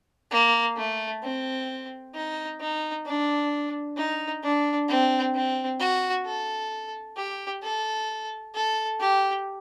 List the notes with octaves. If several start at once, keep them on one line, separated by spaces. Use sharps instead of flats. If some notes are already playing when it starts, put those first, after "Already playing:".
A#3
A3
C4
D#4
D#4
D4
D#4
D4
C4
C4
F#4
A4
G4
A4
A4
G4